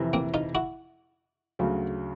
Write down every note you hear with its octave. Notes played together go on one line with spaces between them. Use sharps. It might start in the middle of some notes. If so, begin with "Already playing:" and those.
Already playing: F2 C3 E3
A#3 C4
D#4 F4
E4 F#4
D2 C#3 F#3